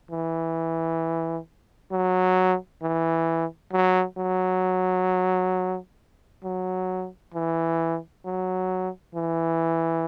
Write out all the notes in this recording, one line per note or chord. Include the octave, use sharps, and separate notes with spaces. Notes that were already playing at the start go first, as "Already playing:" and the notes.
E3
F#3
E3
F#3
F#3
F#3
E3
F#3
E3